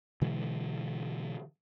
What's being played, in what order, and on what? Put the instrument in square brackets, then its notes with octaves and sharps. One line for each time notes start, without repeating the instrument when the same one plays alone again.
[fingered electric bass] B2 D3 E3 G#3